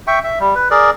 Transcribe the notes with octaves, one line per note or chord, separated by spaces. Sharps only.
E5 G5 C#6
E5
G3
B4
G#4 A#4 D5